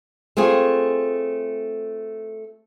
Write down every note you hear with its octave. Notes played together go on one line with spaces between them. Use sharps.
A3 C4 F4 G#4